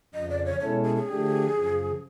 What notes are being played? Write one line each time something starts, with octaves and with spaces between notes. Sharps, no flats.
F2 C#3 F3 D#5
D5
C#5
B2 G#3 C#4 E4 A4 C#5
G#4
G#4
D3 F3 A3 D4 G4
F#2 C#3 F3